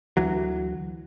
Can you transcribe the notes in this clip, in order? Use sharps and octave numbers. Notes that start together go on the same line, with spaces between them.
D2 E3 F#3